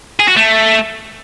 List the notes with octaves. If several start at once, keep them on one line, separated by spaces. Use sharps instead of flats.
G#4
F#4
A3